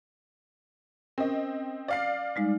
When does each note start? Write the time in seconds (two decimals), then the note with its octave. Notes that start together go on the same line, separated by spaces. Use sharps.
1.18 C4 C#4 A#4 D#5
1.88 D5 F5 C7
2.36 G3 G#3 D#4